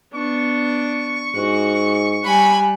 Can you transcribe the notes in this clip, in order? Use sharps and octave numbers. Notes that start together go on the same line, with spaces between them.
B3 D4 C#6
G#2 F#4
G3 F#5 G#5 B5